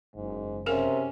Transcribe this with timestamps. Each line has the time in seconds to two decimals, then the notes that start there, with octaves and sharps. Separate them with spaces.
0.15 F#1 G#2
0.66 C3 C#4 G#4 A#4 F5